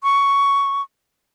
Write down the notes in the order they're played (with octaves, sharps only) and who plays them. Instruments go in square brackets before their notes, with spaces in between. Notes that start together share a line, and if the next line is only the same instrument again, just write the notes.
[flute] C#6